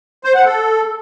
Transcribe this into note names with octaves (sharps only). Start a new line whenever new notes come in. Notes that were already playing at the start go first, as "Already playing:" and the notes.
C5
F#5
A4